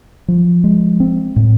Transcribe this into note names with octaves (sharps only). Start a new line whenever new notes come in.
F3
G#3
C4
A2